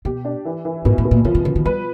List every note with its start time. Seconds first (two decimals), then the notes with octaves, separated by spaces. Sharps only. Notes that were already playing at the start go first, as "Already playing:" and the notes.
0.05 B2 G4
0.25 D4
0.45 E3
0.65 E3
0.85 G#2 B2
0.98 A2
1.04 B2
1.11 A#2
1.25 C3 F3
1.35 C3
1.45 C#3 F3
1.56 D#3
1.65 G3 B4